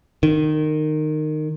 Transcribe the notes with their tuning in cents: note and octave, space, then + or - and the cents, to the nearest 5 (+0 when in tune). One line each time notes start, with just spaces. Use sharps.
D#3 -20